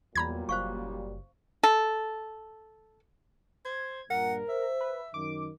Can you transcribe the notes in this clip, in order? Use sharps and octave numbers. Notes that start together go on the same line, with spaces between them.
E2 A#2 F#3 G3 A#5 B5 G#6
F#1 C5 F5 C#6
A4
C5 G#6
G2 A#2 A#4 F#5
C5 E5
B4
F#2 D#3 D6